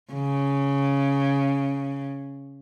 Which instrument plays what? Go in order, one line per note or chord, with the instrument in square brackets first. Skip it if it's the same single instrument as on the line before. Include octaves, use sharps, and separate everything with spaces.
[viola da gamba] C#3